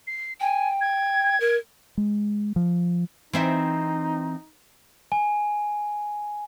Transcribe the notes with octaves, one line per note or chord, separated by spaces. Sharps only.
C7
G5 G#5
G#6
A#4
G#3
F3
E3 C4 D#4 E5
G#5